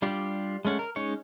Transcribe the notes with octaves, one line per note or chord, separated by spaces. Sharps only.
G3 D4 F4 G4
G#3 A3 C#4 F#5
A#4
G#3 C#4 D#4 C#5